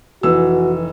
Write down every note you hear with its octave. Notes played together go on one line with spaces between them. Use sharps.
F1 E3 F#4 E6